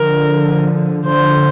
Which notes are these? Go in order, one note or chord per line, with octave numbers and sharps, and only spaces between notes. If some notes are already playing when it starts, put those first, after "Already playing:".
Already playing: D3 F3 A#4
D3 F3 C5